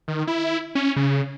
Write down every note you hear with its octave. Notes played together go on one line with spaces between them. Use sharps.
D#3
E4
C#4
C#3